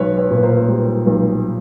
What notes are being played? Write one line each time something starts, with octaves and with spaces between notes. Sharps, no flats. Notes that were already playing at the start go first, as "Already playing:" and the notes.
Already playing: B1 B4 C#5
B4 C#5
A#2 B4
A#4 C5
G3
B1